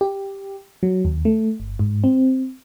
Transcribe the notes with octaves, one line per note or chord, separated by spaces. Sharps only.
G4
F#3
D#2
A3
G1
G#2
C4